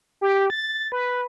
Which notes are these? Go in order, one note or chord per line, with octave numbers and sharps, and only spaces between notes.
G4
A6
B4